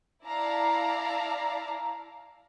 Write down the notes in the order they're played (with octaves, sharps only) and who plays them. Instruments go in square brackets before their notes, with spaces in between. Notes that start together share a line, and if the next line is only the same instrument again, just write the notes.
[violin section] E4 D5 F5 A5 A#5